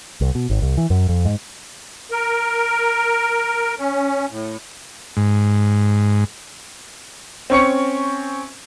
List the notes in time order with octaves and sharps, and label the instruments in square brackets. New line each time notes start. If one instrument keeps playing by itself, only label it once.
[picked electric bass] C2
B2
G#1
C2
E3
F#2
F2
G#2
[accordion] A#4
C#4
A2
[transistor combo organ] G#2
[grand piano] C4 C#4 C#6 C#7